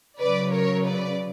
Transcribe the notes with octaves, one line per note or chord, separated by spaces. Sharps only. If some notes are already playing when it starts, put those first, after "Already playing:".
C#3 F#3 B4 D5
A#4 C#5
B4 D5